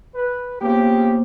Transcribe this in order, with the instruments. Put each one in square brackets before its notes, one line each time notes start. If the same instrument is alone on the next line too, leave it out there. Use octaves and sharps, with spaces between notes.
[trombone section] B4
[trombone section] C#3 F4 G4 [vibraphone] A#3 B3 C5